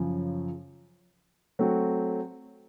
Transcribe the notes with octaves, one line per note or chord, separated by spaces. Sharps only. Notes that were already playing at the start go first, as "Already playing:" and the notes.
Already playing: F#2 C#3 F3
F#3 A3 C4 F#4